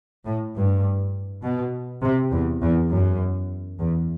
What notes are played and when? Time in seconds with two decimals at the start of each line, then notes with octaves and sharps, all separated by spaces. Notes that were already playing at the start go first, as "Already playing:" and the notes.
0.25 A2
0.55 G2
1.43 B2
2.02 C3
2.32 E2
2.62 E2
2.91 F#2
3.80 E2